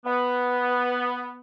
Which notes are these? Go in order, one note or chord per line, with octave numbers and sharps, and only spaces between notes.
B3